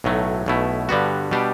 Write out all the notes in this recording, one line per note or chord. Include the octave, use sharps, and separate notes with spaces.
B1 A2 F#3 A3
B1 B2 A3 E4
G2 D3 G3 B3 F#4
B2 G3 D4 G4